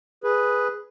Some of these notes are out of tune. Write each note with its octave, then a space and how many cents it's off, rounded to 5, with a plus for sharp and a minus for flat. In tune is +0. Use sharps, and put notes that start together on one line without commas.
G#4 +0 B4 +0